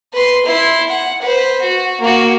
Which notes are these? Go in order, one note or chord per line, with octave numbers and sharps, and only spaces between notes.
B4 C6
E4 C6
F#5
B4 C5
F#4
A#3 F#4